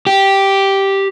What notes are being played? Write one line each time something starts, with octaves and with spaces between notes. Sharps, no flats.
G4